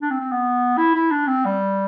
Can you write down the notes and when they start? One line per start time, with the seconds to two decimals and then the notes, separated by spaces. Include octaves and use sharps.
0.02 D4
0.10 C4
0.20 C4
0.32 B3
0.78 E4
0.94 E4
1.11 D4
1.27 C4
1.45 G3